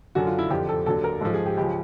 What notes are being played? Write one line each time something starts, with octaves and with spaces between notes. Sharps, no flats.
F#2 D3 F#3 F#4
F4
E4
F2 D3 F3 G4
A4
D#2 D3 F#3 A4
A#4
G#2 F3 A4
G#4
G4
C#2 C#3 F3 G4